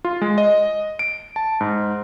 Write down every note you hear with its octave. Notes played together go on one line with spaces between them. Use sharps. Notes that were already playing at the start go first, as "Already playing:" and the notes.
F4
G#3
D#5
D7
A5
G#2